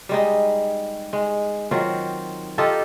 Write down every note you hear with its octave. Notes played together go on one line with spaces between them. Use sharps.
G3 G#3 D#4
G#3
D#3 F#3 C4 F4
D#4 F4 G4 A4